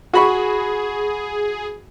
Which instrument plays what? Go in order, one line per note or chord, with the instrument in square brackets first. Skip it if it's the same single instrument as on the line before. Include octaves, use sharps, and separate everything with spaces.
[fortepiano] F#4 B5 C#6 [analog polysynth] G#4